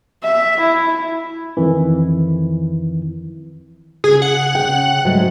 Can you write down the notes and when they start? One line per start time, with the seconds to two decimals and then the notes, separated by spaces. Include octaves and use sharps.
0.23 E5
0.60 E4
1.57 F2 D#3 E3
4.04 C#3 G#4
4.22 F#5
4.55 C#3 G5
5.05 G#2 F#3 A3